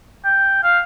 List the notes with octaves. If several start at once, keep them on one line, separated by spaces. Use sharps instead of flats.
G5
F5